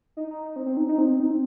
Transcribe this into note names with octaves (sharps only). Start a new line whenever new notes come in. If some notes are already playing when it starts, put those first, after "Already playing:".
D#4
D#4
D#4
C4
C4
D#4
D#4
C4
C4
D#4
C4